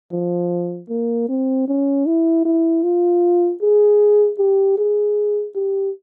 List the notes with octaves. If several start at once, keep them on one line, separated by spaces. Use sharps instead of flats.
F3
A#3
C4
C#4
E4
E4
F4
G#4
G4
G#4
G4